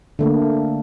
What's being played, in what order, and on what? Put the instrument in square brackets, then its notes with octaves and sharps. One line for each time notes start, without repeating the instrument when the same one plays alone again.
[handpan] D3 A3 A#3